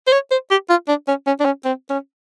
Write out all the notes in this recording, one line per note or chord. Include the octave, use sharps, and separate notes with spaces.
C5
C#5
C5
G4
F4
D4
C#4
C#4
D4
C#4
C4
C#4